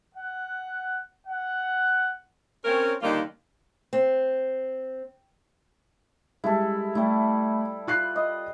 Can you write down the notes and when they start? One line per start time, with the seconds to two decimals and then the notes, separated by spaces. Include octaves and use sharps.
0.15 F#5
1.27 F#5
2.65 C4 C#4 A#4
3.02 D#2 D3 D#3 G3 A#3 F4
3.93 C4
6.44 G3 G#3 E4 A4
6.95 G3 A3 E4
7.87 F4 F#6 C7
8.16 D#5